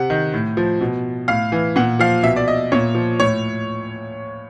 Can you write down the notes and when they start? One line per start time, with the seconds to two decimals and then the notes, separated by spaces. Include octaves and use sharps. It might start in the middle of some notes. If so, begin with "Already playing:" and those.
Already playing: C3 F#5
0.10 D#3
0.34 A2
0.57 F3
0.81 B2
1.28 A2 F5
1.52 E3
1.76 A#2 F#5
1.99 F3 F5
2.23 B2 E5
2.36 D5
2.48 D#5
2.72 A#2 C#5
2.95 F3
3.20 A2 C#5